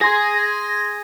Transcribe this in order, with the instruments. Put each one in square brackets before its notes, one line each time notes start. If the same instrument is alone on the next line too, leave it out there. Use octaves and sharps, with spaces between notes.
[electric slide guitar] G#4 G#5 [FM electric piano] C6 G#6 A#6